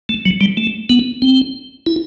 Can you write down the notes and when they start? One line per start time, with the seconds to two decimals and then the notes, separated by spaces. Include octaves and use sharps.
0.09 A3
0.26 F#3
0.41 G3
0.57 A3
0.90 B3
1.22 C4
1.86 E4